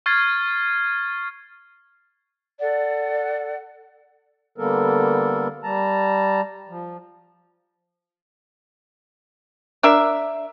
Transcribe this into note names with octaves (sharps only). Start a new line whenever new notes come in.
C#6 F6 G#6 A6 C7
A4 D5 F#5
D3 G3 A#3 B3 A4 A#4
G3 A5 A#5
F3
D4 A#4 E5